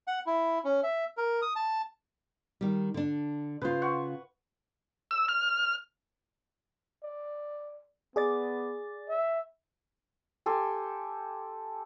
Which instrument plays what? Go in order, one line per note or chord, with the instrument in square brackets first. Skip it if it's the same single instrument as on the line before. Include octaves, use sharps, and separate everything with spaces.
[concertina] F#5
E4
C#4
E5
A#4
D#6
A5
[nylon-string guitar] D#3 G3
D3 D4
[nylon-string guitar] C#3 F4 [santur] B4 C5
[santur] F#5 C#6
[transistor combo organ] E6
F6
[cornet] D5
[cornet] B3 [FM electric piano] G#4 D5 A6
[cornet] E5
[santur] G4 A4 G#5 C6